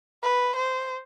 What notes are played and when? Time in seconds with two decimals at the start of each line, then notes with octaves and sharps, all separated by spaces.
0.23 B4
0.56 C5